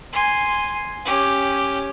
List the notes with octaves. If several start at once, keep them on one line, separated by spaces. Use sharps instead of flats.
G#5 C6
C#4 G4